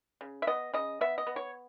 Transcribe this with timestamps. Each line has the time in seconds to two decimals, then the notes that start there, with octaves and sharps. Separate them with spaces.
0.21 C#3
0.42 E5
0.47 B3 D#5
0.74 C#3 D#5
1.01 B3 E5
1.18 D#5
1.27 B3
1.36 C#5